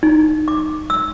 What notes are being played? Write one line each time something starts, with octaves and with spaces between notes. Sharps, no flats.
D#4
D6
E6